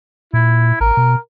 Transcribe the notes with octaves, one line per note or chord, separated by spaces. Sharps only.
A#2 E4
A1 A#4
B2